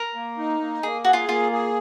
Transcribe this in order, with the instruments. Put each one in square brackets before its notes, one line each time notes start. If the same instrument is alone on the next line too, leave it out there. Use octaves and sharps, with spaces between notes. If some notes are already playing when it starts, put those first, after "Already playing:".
Already playing: [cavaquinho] A#4
[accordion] A#3
D#4
A#3
[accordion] A#3 [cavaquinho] G#4
[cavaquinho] F#4 [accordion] G#4
[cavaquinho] F4
[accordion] A#3 [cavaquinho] F4
[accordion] G#4